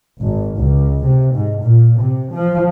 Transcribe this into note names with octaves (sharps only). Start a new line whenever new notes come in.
G#1
C#2
C3
G#2
A#2
C3
F3